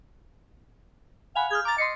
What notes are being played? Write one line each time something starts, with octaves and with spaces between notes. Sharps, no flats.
F5 F#5 G#5 B5
G#4 F6 G6 G#6
A#5 D6 A6
D#5 C6 C7 C#7